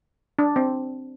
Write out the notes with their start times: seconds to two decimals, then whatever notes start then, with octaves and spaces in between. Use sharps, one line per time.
0.39 D4
0.56 C4